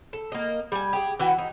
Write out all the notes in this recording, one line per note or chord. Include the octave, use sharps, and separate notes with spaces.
A4
A#3 D#5
G3 G#5
G4 G#4
E3 F#4 G5
D#4